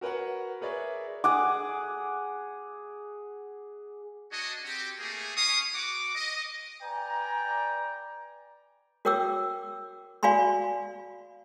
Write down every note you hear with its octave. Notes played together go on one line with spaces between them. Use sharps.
F#4 A#4 B4 C#5 F#5
G#4 A#4 B4 C#5 D5 E5
G#4 F#5 D6
D4 F#4 C#5 D#5
C4 F#4 G4
A3 A#3 G#4
C#4 F5 C#6 D#6
F#4 F#5 D6
D#5
B4 D5 G5 G#5 A#5
F#4 A#4 C#5 G5 D6 E6
F#4 D5 F5 G#5 B5 C6